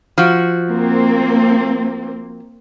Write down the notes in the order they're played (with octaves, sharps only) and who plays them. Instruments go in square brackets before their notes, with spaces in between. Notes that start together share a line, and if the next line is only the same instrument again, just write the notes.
[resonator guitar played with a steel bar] F3 F#4
[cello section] A#3 C4